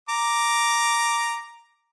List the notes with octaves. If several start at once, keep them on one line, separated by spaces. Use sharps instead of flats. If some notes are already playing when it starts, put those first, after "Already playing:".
A#5 D6